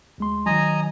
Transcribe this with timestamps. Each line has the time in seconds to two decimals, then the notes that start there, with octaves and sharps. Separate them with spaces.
0.18 D2 G#3 C6
0.46 D#3 F#3 D#5 G#5 A#5